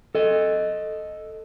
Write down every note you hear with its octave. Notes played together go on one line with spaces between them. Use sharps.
A4 D#5